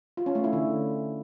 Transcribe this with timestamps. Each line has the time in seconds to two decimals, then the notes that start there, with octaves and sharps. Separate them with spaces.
0.17 F4
0.26 C#4
0.35 A3
0.44 E4
0.53 D3